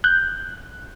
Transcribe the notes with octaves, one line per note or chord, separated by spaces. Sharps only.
F#6 G6